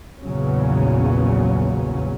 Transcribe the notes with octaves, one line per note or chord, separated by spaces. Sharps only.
A#1 E2 A#2 C#3 F#3 C#4